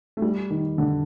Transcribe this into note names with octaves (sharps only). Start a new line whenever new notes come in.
A3
G3
D#3
D3